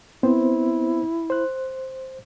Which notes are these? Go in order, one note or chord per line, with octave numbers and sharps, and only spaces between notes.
B3 C4 E4 C5
C5 F#6